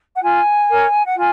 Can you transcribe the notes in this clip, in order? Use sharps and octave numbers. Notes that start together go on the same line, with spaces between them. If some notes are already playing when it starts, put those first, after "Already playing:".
F#5
F4 G#5
A#4 C#5
F#5
F4 G#5